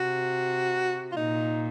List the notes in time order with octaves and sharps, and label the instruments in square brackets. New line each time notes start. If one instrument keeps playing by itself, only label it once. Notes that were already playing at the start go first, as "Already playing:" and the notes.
Already playing: [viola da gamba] C3 [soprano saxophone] F#4
[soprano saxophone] F4
[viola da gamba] A#2 [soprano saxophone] D#4